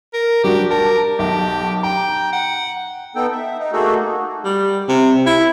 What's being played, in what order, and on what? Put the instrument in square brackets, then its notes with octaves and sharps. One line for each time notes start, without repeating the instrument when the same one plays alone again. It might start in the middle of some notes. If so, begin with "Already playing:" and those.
[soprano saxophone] A#4
[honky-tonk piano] G3 D4 F#4 [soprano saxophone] G4
[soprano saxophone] A#4 [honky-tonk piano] A5
[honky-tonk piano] B1 [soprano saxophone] G4
[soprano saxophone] G5 [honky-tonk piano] A#5
[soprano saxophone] F#5
[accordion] B3 D#4 A4 G5
E5
D#4
A3 A#3 D#4 F#4 G#4 A4
[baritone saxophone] G3
C3
E4